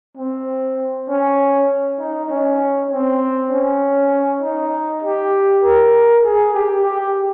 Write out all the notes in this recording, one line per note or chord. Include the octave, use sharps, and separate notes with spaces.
C4
C#4
D#4
C#4
C4
C#4
D#4
G4
A#4
G#4
G4
G4